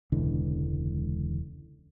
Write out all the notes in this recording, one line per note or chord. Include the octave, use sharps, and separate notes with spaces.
E1 C#2 D3 E3